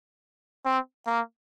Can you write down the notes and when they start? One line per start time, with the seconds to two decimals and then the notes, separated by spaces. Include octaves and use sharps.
0.66 C4
1.07 A#3